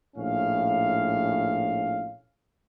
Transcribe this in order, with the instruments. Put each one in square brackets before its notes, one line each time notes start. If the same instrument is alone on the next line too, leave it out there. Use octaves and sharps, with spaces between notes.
[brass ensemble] A#1 A2 C#4 F5